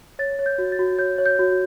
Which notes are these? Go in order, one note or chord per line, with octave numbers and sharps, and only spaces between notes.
C#5 A6
C#5
G6
F#4
A6
F#4
C#5 G6
C#5
G6
F#4